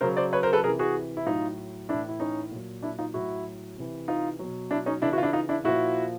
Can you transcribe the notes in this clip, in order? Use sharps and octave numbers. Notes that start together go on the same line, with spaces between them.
C#3 F#3 A#4 C5
C5 D5
B4 C#5
A#4 C5
A4 B4
C3 E3 G#4 A#4
F#4 G#4
E4
A2 F#3 D#4 F4
A2 E3 D4 E4
E4
C#4 D#4
A#2 F#3
D4 E4
D#4 F4
A2 F#3 E4 F#4
C3 E3
D#4 F4
B2 F#3
D4 E4
C#4 D#4
C#3 E3 D4 E4
E4 F#4
F4
D4 E4
D#4 F4
D4 E4
A#2 F3 E4 F#4